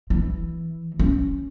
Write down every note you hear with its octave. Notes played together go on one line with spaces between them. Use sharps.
E3
C#4